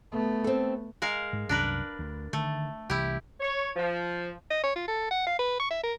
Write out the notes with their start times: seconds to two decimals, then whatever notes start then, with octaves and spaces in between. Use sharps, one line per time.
0.12 A3 B3
0.44 C4 A4
1.02 G#3 A#4 F5
1.33 G#2
1.49 C2 F#2 D4 A#4 B4
1.99 D2
2.33 D3 D#3 A3
2.90 C2 E3 E4 G4
3.40 C#5
3.76 F3
4.50 D#5
4.63 C#5
4.76 F4
4.88 A4
5.11 F#5
5.26 F5
5.39 B4
5.59 C#6
5.70 E5
5.83 A#4